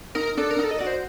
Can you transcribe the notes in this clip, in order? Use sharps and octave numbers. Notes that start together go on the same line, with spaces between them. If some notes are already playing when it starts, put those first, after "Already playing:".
D#4 A#4
D4 A4
A#4
D#4
A4
D#5
F#4 D5
C5